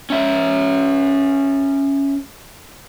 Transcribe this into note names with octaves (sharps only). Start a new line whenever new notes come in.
C#4 E5